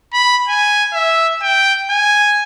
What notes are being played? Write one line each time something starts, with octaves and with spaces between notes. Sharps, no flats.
B5
G#5
E5
G5
G#5